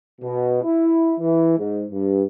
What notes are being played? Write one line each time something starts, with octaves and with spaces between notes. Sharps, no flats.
B2
E4
E3
G#2
G2